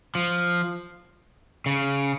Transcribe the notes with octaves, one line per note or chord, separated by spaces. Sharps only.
F3
C#3